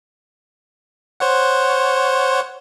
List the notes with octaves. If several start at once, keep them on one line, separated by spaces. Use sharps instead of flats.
C5 C#5 F#5